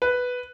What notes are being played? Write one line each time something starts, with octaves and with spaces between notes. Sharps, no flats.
B4